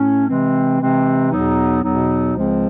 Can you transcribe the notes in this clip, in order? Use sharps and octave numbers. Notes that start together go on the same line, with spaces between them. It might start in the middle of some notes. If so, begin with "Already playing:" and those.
Already playing: A2 A3 C#4
C3 E3 G#3 C4
C3 E3 G#3 C4
E2 B2 F#3 B3 D#4
E2 B2 F#3 B3 D#4
C#2 C#3 F3 G#3 C4